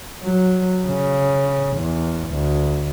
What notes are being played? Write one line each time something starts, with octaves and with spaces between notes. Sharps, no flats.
F#3
C#3
E2
D2